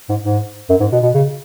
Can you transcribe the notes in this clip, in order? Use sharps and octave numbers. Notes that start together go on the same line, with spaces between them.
G#2
G#2
F#2
G#2
B2
B2
C#3